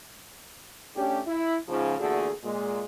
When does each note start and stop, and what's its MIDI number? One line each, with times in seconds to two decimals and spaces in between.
0.96 1.19 57
0.96 1.19 61
0.96 1.19 62
0.96 1.19 67
1.27 1.57 64
1.68 1.94 44
1.68 1.94 49
1.68 1.94 53
1.99 2.30 40
1.99 2.30 46
1.99 2.30 50
1.99 2.30 57
1.99 2.30 66
1.99 2.30 68
2.44 2.83 46
2.44 2.83 56